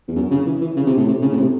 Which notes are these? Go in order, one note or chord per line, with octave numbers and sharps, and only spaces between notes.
E2
F#2
C#3
E3
E3
C#3
C3
A2
C3
C#3
A2
C3